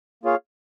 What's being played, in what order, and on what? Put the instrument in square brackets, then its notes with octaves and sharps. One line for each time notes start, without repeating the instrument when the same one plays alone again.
[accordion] A#3 F4 G#4 C#5 F5